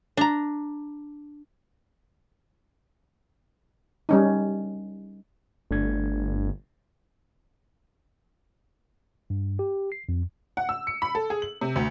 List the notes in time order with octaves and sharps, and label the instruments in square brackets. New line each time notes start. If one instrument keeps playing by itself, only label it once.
[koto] D4 A#5
[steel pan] G3 C#4 D#4
[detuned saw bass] G1 [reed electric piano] A3 D4 G#6
[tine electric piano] G2
G4
C7
F2
[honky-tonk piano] F#5
E6
C#7
B5
A4
G#4
F#7
C3
D2